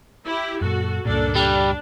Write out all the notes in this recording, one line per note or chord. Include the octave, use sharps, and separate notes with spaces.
E4 G4
F#2 A#2 F#4 A4
C#2 G2 A#2 A#3 D4 A4
G3 D4